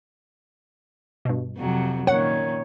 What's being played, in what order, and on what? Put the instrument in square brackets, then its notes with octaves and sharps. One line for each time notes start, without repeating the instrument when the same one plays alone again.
[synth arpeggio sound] G2 B2
[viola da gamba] F2 C3 F#3
[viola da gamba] A#2 D#3 [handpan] C#5 [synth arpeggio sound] F#5